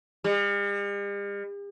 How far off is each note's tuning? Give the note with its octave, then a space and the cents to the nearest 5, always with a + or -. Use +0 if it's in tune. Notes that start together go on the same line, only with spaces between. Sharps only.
G3 +45